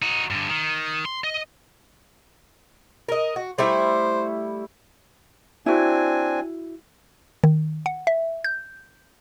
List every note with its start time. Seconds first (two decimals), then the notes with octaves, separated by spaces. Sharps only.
0.02 D#4 F#4
0.30 G2 D3
0.49 D#3
1.05 C6
1.24 D#5
3.09 A#4 D#5
3.36 F#4
3.58 G3 A3 E4 C5
5.66 C4 D4 E4 F#4 G#5
7.44 D#3
7.86 F#5
8.07 E5
8.44 G6